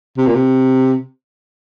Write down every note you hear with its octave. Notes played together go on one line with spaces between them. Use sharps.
C3
A#2
C3